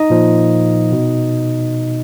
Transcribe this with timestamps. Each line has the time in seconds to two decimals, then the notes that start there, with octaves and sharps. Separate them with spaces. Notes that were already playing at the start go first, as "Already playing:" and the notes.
Already playing: D#4 D#5
0.10 A#2 F3
0.92 B2